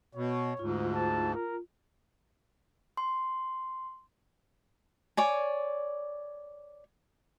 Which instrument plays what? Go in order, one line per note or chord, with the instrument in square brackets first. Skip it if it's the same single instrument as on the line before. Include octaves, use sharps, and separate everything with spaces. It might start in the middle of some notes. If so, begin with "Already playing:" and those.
[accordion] B2 [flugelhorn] C#5
[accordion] D2 G#2 [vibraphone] F4
[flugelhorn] A5
A#4
[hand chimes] C6
[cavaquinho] C#5 D5 G#5